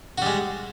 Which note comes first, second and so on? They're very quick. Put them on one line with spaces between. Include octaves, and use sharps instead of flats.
F#4 G3 G#3